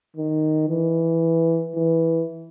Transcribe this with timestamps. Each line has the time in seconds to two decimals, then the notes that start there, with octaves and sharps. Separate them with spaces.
0.16 D#3
0.69 E3
1.76 E3